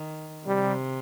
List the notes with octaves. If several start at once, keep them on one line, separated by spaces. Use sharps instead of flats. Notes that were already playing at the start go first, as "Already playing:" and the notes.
Already playing: D#3
C3 G3